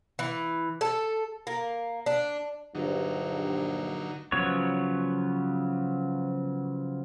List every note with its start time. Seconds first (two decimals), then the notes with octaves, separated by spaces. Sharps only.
0.19 E3
0.81 A4
1.47 A#3
2.06 D4
2.75 A#1 G2 D3 F#3 D#4
4.32 C#3 F3 F#3 B3 C#5